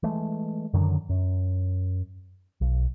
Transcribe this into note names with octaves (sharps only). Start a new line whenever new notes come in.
E3 G#3 A3
F#2 D3 D#3 F#3
F#2
B1